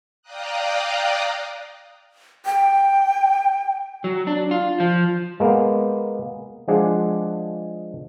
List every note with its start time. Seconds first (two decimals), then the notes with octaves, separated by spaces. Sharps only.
0.22 D5 F5 G5 A#5 D#6 F#6
2.46 G5
4.04 F#3
4.27 D4
4.51 F4
4.80 F3
5.40 G#3 A#3 B3
6.68 F3 G#3 D4 G#4 F#5